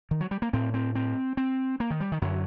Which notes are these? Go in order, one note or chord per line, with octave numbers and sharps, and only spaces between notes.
D#3
F#3
G3
A#3
A2 C4
C4
C4
C4
A#3
D#3
G3
D#3
F#2 D3 F#3